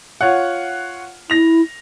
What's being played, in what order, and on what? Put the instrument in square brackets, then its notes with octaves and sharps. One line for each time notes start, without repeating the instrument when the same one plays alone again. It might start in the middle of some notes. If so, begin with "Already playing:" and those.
[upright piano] F4 C#5 F#5
[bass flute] E4 [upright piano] A#6 F7